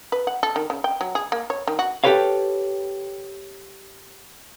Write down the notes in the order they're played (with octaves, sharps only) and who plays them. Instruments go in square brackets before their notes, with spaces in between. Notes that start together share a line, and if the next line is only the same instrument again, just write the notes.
[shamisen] B4
F#5
A4
D#3
C#3
G5
F#3
G#4
A#3
C#5
D#3
F#4
[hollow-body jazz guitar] G4 A4 B4 C#5 F5